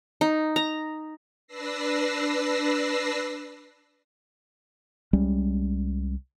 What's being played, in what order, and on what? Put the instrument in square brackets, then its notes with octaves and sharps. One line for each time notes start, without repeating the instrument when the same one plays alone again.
[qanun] D#4
A#5
[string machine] D4 B4 E6 A#6 C7
[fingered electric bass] C2 G3 G#3 C#4